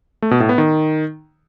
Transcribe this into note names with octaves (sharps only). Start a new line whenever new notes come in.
A3
B2
A2
B3
D#3